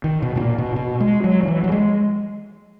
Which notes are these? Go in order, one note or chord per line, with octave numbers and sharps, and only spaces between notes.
D#3
B2
G#2
A#2
B2
B2
G#3
F#3
F#3
E3
F#3
G#3